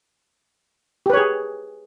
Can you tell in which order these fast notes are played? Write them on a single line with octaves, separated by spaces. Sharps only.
G4 B4 C#5 G#4